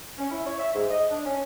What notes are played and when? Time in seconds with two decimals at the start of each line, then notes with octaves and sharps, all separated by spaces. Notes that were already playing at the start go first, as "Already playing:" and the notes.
0.18 C#4
0.31 E4
0.47 C#5
0.59 E5
0.75 G#2
0.90 D#5
1.10 D4
1.25 C#4